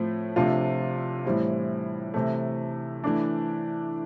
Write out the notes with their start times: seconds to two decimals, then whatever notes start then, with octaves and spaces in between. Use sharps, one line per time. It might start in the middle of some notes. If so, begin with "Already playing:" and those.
Already playing: A2 F3 A3 C4
0.36 C3 F3 A3 D4 F4
1.25 A2 E3 G3 C4 E4
2.14 C3 E3 A3
3.04 E3 A3 D4